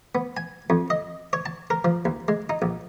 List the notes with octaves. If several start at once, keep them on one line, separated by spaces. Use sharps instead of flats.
B3
G#5
F2
D#5
C#5
A5
A#4
F3
D#2
G#3
D#4
A#1